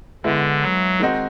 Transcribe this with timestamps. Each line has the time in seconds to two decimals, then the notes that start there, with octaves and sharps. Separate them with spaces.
0.24 D3 G#3 B3 E4
0.61 F#3
1.00 D#3 G#3 C4 D#4 F#4